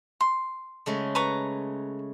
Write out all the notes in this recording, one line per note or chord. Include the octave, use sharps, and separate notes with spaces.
C6
C#3 G#3 A3
B4 A#5 C#6